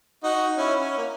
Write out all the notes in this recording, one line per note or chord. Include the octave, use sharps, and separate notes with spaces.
D#4 F#4
C#4 E4
C#4
A#3